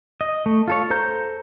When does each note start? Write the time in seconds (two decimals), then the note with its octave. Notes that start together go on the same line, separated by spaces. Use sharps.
0.21 D#5
0.46 A3
0.68 F4 A4 C#5
0.90 A4 C5 A#5 G6